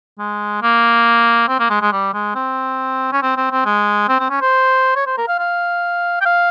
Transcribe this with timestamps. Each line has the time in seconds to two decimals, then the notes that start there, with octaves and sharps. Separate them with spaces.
0.19 G#3
0.62 A#3
1.49 C4
1.60 A#3
1.70 G#3
1.82 G#3
1.92 G3
2.14 G#3
2.35 C4
3.13 C#4
3.22 C4
3.37 C4
3.52 C4
3.66 G#3
4.09 C4
4.20 C4
4.30 C#4
4.42 C5
4.96 C#5
5.07 C5
5.18 A#4
5.28 F5
5.39 F5
6.21 G5
6.26 F5